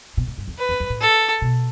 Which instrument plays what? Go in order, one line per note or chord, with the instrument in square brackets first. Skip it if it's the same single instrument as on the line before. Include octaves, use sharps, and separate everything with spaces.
[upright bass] B2
A2
G2
F2
[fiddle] B4
[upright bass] E2
F2
A2
[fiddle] A4
[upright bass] B2